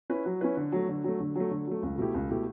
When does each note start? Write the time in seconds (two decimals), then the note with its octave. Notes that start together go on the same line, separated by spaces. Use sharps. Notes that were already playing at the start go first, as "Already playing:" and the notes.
0.10 C#4 E4 B4
0.26 F#3
0.41 C#4 E4 B4
0.57 D3
0.72 F#3 A3
0.89 D3
1.04 F#3 A3
1.20 D3
1.35 F#3 A3
1.51 D3
1.67 F#3 A3
1.82 C#2
1.98 B2 A3 E4 G4
2.14 C#2
2.30 B2 A3 E4 G4